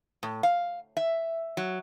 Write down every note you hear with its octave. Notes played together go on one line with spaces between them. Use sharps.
A2
F5
E5
F#3